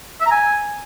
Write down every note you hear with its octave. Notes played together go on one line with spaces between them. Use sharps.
E5
A#5
G#5